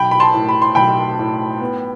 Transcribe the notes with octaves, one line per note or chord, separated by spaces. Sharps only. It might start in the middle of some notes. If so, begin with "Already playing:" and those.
Already playing: B1 G5 B5
B5
A5 C6
A2
B5
C6
B1 G5 B5
A2
B3